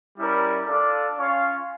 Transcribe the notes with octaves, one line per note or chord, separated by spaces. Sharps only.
G3 C#4 E4 A#4 D5
D4 F4 A4 D5
C#4 F4 C#5 F5